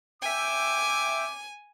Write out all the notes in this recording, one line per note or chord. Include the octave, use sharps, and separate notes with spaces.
E5 G5 G#5 D6